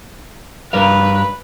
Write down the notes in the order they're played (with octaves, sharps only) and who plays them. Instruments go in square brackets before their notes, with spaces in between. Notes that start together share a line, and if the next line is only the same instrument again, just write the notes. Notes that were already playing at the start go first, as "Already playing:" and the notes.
[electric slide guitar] G2 A#4 F5 [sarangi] B4